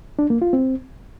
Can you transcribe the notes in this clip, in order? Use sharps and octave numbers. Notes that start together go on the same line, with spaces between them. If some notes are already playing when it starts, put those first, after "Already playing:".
D4
A#3
F4
C4